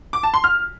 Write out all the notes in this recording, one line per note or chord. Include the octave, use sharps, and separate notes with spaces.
D6
A5
C6
F6